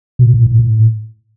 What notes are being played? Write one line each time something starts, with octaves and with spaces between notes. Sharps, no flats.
B2
A2
A2
A2